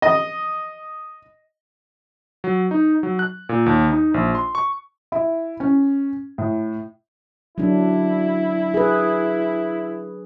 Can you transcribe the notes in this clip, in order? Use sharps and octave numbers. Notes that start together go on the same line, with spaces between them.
D#5
F#3
D#4
F#3
F#6
A#2
D#2
D#4
A#1
C6
C#6
E4
C#4
A2
F#3 D4 E4
G#4 B4